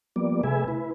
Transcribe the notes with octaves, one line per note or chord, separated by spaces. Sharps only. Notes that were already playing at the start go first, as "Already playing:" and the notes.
F3 G3 A#3 B3 D5
C3 A3 G#4 B4 E5 G#5
E4 B4